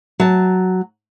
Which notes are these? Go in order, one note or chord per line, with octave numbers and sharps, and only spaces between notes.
F#3 A5